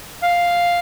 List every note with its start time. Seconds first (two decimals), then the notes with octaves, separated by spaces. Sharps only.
0.22 F5